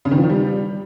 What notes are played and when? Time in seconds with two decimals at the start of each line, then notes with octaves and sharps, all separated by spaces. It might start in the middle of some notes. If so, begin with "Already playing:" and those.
0.05 C#3
0.11 D#3
0.17 F3
0.24 D#3
0.30 G3